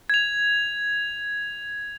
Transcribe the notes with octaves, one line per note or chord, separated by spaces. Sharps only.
G#6 F7